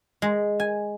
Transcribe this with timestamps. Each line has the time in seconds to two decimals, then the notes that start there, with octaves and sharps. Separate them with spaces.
0.22 G#3
0.60 G#5